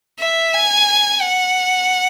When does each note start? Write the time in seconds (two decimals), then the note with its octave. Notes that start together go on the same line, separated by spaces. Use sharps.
0.19 E5
0.53 G#5
1.22 F#5